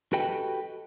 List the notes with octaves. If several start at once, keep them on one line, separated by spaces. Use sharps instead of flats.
F#4 G4 A4 B4 D#5 G5